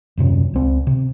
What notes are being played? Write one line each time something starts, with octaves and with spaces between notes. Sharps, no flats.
D#1 F#2 C3 C#4
C#2 C4
C3